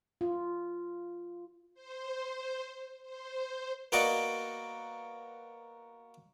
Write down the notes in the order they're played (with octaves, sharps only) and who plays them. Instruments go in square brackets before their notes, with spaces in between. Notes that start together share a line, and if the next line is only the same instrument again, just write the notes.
[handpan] F4
[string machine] C5
C5
[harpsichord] A#3 B3 F#4 D5 D#5